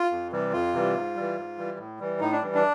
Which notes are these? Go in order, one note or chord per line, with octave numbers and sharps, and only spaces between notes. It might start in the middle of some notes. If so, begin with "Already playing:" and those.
Already playing: F4
F2
C3 E3 G3
F2 F4
C3 E3 G3
G#2
E3 G3
G#2
E3 G3
A2
E3 G3
A2 D#4
D4
E3 G3
D4